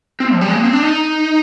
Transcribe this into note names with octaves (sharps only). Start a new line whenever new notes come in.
C4
F3
G3
G#3
A#3
C4
D4
D#4